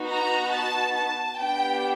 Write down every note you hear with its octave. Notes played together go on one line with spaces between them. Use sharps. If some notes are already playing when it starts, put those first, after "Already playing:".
Already playing: B3 D#4 F#4
A#5
A5
A5
B3 D4 G4 G5